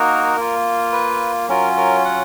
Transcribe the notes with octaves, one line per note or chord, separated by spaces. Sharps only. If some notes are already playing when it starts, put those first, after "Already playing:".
Already playing: A#3 D#4 F#4 A#4
A#3 F4
B4
F#3 C#4 F4 A#4
A#4
F#5